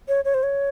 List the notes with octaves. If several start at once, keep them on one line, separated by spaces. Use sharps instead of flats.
C#5
C#5
C5
C#5